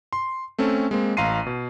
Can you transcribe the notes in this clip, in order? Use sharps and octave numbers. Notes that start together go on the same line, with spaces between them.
C6
A3 C4 C#4 A4
G#3 A#3 C4
A1 F5 A#5 C6 C7 D#7
B2